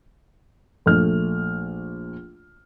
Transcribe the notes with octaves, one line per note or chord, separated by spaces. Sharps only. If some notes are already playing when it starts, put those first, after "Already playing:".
A#1 A3 F6